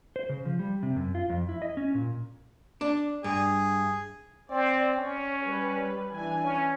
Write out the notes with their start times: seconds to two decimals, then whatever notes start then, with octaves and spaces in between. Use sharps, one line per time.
0.16 C5
0.29 C#3
0.45 F3
0.59 G3
0.83 C3
0.96 F#2
1.15 F4
1.30 F2
1.49 E4
1.62 D#5
1.77 C#4
1.95 A#2
2.81 D4
3.24 G2 G#4
4.51 C4 D5
4.97 C#4 C#5
5.46 G3 B4
6.12 E3 D4 G#5
6.44 C#4